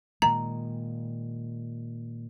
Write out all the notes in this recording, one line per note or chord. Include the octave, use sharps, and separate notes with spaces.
A#2 D#3 G#3 A#5